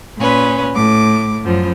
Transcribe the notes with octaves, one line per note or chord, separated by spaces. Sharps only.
A#2 C#4 B4
A2 D6
F#2 F3